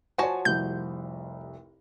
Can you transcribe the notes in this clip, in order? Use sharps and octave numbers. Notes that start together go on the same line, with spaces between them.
F3 F#4 C#5 G#5 A5
F1 C2 G6